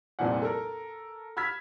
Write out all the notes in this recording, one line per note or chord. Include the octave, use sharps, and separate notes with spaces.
F1 C2 F2 A#2 D5 F#5
A4 A#4
B5 E6 F6 G#6 B6